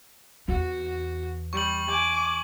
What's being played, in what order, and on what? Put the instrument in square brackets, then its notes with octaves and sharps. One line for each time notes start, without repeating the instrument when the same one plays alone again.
[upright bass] E2 [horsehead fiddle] F#4
[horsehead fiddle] G3 [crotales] C#6 F#7
[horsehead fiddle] G#5 [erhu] D6